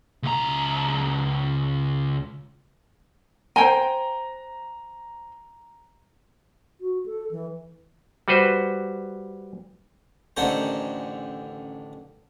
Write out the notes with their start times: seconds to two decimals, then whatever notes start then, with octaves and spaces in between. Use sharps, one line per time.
0.23 C#2 A#5
3.56 C5 G5 G#5 A#5 G7
6.81 F#4
7.06 A4
7.31 E3
8.28 G3 F#4 B4 C5
10.37 A1 D3 D#3 C#4 C5 A#5